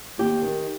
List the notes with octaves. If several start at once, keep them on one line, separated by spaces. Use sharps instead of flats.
D#2 G4
D#3